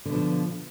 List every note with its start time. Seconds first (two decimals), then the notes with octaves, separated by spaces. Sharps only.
0.05 D3
0.10 B2
0.14 F3